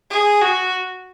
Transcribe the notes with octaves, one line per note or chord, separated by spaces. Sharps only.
G#4
F#4